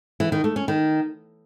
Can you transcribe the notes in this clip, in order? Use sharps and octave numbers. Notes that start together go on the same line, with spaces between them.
E3
D#3
A3
C#4
D#3